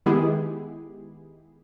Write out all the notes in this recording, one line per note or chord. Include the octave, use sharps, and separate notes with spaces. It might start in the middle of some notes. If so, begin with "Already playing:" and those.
D#3 G#3 B3 E4 G4 G#4